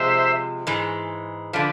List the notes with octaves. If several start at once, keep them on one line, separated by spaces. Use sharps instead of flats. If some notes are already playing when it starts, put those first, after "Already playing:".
Already playing: C3 F3 G#3 C5 E5
G#2 E3 G#3
D3 F3 B4 D5